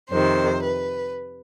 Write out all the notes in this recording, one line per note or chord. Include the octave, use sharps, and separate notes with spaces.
F2 C3 D#3 C5
B4